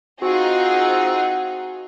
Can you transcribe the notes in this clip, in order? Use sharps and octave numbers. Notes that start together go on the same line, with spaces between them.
C4 D#4 F4 F#4 G#4 F#5